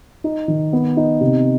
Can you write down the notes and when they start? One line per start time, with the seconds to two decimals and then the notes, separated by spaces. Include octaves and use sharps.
0.24 D#4
0.48 D#3
0.73 B3
0.97 D#4
1.21 C3